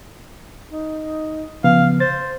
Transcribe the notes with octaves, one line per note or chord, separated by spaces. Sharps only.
D#4
C#3 F3 B3 F5
C5 A6